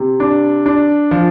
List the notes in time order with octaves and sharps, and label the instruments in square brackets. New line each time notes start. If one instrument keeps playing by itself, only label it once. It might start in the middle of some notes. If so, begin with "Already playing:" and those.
Already playing: [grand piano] C3
D4
D4
F3